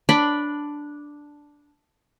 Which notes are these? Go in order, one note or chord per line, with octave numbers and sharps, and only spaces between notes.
D4 B5